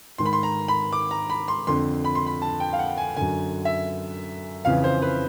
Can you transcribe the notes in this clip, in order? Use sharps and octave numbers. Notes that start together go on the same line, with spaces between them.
G#2 D#3 C6
B5
C6
A#5
B5
D6
A#5
B5
C6
F2 D3 C6
B5
C6
B5
A5
G5
F5
F#5
G#5
F#2 D3 G#5
E5
F2 C#3 E3 F5
C5
B4